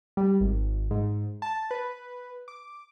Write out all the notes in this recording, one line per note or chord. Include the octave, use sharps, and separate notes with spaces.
G3
G#1
G#2
A5
B4
D6